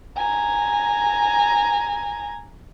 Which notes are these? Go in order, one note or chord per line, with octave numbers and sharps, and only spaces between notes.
G#5 A#5